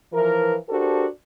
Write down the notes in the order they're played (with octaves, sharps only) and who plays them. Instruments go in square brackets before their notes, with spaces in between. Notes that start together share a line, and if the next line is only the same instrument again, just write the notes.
[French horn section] E3 F3 A#4
D4 F#4 G4 A4 A#4 C5